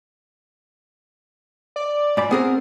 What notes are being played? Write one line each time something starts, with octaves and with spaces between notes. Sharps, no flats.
D5
G#2 D5 B5
B3 C4 G#4 A#4